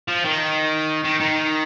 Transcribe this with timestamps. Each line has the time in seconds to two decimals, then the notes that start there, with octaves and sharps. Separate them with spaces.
0.08 F3
0.25 D#3
1.04 D#3
1.20 D#3